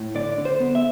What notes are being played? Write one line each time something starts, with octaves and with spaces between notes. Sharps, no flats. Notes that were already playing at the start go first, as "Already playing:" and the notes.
Already playing: A2
D3 D5
D3
C5
B3
E5